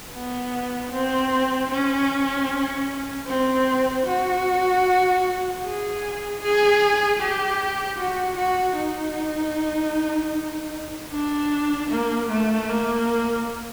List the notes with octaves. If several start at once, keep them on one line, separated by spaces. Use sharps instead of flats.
B3
C4
C#4
C4
F#4
G#4
G#4
G4
F#4
F#4
D#4
D4
A#3
A3
A#3